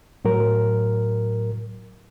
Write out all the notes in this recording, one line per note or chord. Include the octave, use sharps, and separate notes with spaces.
A2 F#3 A#4